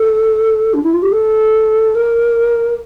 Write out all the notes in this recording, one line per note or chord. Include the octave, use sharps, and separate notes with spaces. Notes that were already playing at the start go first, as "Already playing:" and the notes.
Already playing: A4
D4
E4
F4
G4
A4
A#4